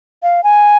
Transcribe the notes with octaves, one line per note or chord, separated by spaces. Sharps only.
F5
G#5